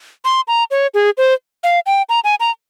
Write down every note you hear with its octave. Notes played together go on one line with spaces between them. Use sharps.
C6
A#5
C#5
G#4
C5
F5
G5
A#5
G#5
A#5